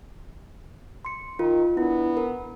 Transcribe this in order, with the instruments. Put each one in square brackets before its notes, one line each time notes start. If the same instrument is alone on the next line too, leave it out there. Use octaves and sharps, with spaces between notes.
[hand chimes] C6 C#7
[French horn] D#3 [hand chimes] F4 A#4
[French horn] B3 [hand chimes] D4 E4
[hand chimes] A#4